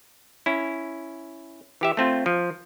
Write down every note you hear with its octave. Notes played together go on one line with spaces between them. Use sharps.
C#4 E4
E3 G4 E5
A3 C4 F4
F3